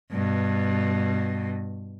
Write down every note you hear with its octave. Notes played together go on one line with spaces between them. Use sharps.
G2 B2